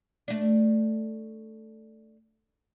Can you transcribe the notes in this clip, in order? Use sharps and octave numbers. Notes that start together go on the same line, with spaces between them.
A3 D4